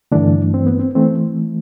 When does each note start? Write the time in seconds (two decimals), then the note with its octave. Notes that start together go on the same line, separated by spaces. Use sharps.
0.12 G2 D3 E3 A3 D4
0.54 C4
0.67 B3
0.79 C4
0.95 E3 A3 C4